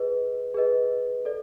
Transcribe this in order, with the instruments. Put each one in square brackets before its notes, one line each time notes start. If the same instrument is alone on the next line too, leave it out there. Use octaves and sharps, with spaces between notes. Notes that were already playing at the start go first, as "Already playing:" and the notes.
Already playing: [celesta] G#4 B4 D#5
G#4 B4 D#5
A4 D5